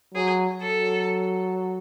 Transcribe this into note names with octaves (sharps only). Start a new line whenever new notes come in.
F#3 G#4
F#3 A4